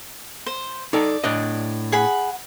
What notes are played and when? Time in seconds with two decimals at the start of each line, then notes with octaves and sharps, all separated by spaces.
0.46 C5
0.93 D#4 A4 D5
1.24 A2 D4 D#5
1.92 G#4 F#5 B5